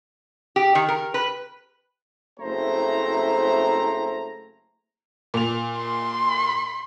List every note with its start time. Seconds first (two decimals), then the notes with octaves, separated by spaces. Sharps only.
0.56 G4
0.75 D#3
0.88 A#4
1.14 B4
2.40 F#1 A3 C4 E4 C5 A#5
5.34 A#2 F7
5.78 C6